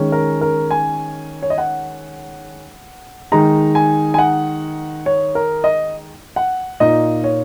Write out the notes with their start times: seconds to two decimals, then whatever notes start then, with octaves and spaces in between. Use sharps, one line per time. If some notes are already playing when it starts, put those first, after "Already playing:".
Already playing: D#3 G#3 C#4
0.12 A#4
0.41 A#4
0.71 G#5
1.42 C#5
1.50 D#5
1.58 F#5
3.32 D#3 G#3 D#4 A#5
3.75 G#5
4.14 G#5
4.19 F#5
5.06 C#5
5.35 A#4
5.64 D#5
6.36 F#5
6.80 A#2 A#3 D#4 D#5
7.24 C#5